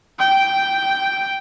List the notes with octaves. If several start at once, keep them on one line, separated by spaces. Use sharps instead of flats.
G5